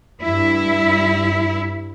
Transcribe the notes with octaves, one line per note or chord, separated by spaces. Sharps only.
G2 E4